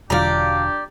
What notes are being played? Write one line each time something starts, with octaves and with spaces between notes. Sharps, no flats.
E1 D3 F#3 D4 F4 G4 D5 A#5